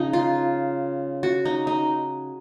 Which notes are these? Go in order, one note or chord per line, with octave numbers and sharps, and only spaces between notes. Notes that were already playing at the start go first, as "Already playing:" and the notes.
Already playing: C#3 F3 D#4
F4
F#4
D#4
D#4